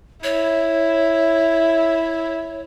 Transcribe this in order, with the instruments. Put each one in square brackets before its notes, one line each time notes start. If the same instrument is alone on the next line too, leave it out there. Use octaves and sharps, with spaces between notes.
[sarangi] E4 [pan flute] C#5